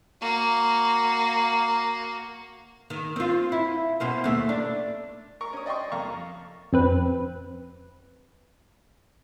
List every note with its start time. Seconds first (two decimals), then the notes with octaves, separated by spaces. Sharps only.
0.21 A#3 F#4
2.90 D#3
3.16 C4 F4
3.52 E4
4.00 B2 C4 C#4
4.24 D#2 A3
4.49 D4
5.41 A#4 C#6
5.53 C#4 D#6
5.66 D5 D#5 G5 C6 C#6
5.92 F2 A#3 F5 A#5 C#6
6.73 F2 C4 B4